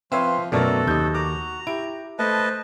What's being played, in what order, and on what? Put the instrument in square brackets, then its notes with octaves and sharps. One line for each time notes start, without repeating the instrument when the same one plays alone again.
[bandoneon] F3 [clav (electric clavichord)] C4 C#5 [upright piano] B4 E5 F5 [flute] C6
[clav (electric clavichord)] F#2 B2 A3 [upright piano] F#3 A#4 D5 [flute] F#4 [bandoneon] A4
[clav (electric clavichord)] D#2 D#5 [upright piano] G6
[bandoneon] A#5 [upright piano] D6
[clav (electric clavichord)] E4 [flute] G4 [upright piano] D7
[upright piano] A3 [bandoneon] B4 D#5 A5 [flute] C5